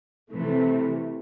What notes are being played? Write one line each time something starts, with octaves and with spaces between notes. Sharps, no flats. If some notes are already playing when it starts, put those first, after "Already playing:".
C3 E3 A3